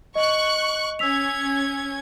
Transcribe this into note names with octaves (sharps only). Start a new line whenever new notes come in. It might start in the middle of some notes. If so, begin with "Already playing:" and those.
D#5 C#6 F#6
C#4 E6 G#6 B6 F7